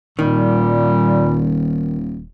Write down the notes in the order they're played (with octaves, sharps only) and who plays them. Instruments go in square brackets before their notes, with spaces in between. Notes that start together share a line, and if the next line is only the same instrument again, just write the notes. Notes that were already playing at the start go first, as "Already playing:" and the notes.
[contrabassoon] D#1 [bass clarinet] A#2 [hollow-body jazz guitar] D#3 [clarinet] G3